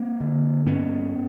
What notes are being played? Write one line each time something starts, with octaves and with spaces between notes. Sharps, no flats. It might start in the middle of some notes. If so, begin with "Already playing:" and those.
Already playing: A#3 C4
D3
G2 B3 C#4